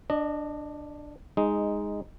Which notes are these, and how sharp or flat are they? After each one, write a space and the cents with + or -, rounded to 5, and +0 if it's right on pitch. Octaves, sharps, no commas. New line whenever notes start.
D4 +5 D#5 -25
G#3 -10 D#4 +0